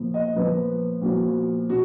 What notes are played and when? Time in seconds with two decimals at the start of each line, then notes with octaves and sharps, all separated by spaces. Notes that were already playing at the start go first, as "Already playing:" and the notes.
Already playing: A#2 F3 B3
0.14 D#5
0.36 A#2 F3 B3 B4
1.02 A#2 F3 B3 F#4
1.69 B2 F#4